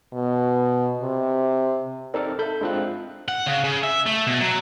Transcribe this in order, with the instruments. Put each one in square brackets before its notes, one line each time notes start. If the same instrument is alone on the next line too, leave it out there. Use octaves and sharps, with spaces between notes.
[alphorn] B2
C3
[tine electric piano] C4 D#4 A4 [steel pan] A#4 D5
[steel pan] A4 E5 [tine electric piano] B5 G6
[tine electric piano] G#3 C4 F#6 [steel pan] D4 F4
[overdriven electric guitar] F#5
C#3
C#3
E5
A3
B2
F#3